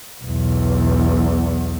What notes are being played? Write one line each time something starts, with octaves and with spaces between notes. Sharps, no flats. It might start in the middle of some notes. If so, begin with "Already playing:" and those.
B1 E2